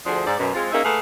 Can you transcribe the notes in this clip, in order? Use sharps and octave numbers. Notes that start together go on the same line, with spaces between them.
D2 F3 D4 G#4 C5 D#5
G#2 C5 D5
F#2 B2
G#3 C4 F4
A#3 C#4 D#4 G#4 E5
A3 A#3 G#4 B4 F5 F#5